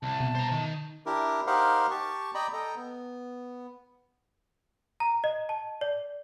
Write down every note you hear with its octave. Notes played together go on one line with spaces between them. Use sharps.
C2 A5
B2
C5 A#5
D#3
D4 E4 G4 A#4
D#4 G4 A#4 C5 F5 F#5
G4 A5 C#6
D5 D#5 G5 A#5 B5
A4 D#5 G5 A#5
B3
A#5
D#5
A5
D5